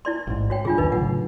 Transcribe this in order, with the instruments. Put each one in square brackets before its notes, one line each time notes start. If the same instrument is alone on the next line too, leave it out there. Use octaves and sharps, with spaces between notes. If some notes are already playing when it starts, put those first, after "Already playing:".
[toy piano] E4 D5 C6
[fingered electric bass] A1 G#2
[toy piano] F#4 C#5 G5
[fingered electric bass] G2 C#3 [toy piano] D4 F4 G#4
[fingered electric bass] B1 E2 D#3 [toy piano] D#4 B4
[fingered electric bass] A2 C#3 F#3 [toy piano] F#5